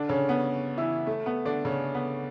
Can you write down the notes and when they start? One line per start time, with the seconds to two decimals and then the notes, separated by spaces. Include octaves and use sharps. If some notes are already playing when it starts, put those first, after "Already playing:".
Already playing: D3 D4
0.09 C#3 C#4
0.29 B3
0.78 E3 E4
1.07 A3
1.26 B3
1.45 D3 D4
1.65 C#3 C#4
1.95 B3